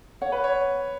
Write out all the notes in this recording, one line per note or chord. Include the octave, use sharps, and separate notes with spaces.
C#5 F#5
B4
C#5